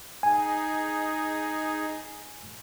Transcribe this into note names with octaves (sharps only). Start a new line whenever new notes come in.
D#4 G#4 G#5